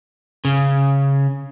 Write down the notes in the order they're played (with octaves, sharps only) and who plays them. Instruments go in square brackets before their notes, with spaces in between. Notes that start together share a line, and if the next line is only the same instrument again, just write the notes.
[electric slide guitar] C#3